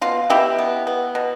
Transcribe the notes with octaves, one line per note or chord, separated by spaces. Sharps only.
B2 F4
B2 E4 G4
B3
B3
B2